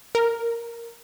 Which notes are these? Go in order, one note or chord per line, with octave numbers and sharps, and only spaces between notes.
A#4